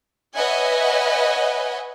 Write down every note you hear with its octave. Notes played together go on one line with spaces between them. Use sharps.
B4 C#5 D#5 E5 F#5 G#5